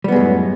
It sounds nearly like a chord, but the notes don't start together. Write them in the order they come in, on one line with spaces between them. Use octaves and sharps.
G3 B3 G#3 F#2 A2